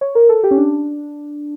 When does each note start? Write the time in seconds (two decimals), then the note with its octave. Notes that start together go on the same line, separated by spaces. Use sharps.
0.01 C#5
0.15 A#4
0.29 A4
0.44 G4
0.51 C#4
0.58 D4